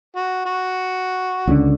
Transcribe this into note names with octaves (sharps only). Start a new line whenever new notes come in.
F#4
F#4
C#2 D3 C#4